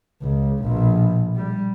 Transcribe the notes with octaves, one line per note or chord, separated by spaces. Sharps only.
C#2
A#1 B2
G3